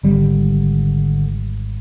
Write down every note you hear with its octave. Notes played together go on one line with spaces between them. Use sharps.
G#1 D3 G3